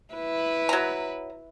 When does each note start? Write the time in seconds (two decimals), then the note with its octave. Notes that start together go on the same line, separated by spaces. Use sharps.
0.14 E4 B4
0.69 F#3 A#5